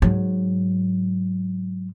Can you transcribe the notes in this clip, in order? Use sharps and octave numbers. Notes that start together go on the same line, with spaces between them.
G#2 F#3